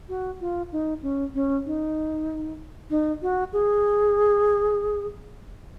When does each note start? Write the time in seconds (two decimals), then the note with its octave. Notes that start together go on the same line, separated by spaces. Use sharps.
0.09 F#4
0.41 F4
0.72 D#4
1.03 C#4
1.34 C#4
1.66 D#4
2.90 D#4
3.22 F#4
3.53 G#4